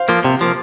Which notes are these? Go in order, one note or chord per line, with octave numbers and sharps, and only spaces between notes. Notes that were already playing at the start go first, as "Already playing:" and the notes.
Already playing: C5 F5
F3 A#3
C3
F3 A#3